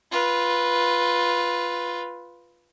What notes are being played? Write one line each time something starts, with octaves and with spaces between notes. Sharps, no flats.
F4 B4